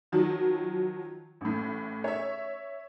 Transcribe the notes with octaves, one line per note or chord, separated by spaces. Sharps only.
D#3 F3 F#3
A1 A2
C#5 E5